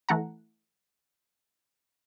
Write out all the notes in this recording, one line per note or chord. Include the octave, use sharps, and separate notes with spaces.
E3 A3 F#5 A#5